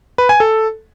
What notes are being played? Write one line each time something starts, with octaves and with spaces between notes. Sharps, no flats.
B4
G#5
A4